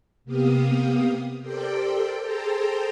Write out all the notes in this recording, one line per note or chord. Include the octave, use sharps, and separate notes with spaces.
C3 A#3 B3 G4 F5 D#6
G4 A4 A#4 C5 D5 G5
G#4 A4 C5 G5 A5 A#5